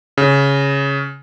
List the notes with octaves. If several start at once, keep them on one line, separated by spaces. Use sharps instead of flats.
C#3